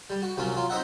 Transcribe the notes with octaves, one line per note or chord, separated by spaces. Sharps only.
G3
F#4
C2 F#3 C#4 F4
F#3 F4
C4 D#4 D#5 E5 F#5